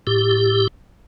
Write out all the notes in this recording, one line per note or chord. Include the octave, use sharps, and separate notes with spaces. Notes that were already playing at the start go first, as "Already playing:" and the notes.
A2 G4